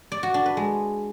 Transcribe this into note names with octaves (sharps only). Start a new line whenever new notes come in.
D5
F#4
D4
B4
G#3